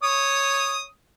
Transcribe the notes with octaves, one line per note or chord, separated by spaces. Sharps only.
C#5 D#6